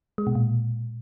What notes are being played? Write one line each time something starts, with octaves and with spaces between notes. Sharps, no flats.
G#3
B2
A#2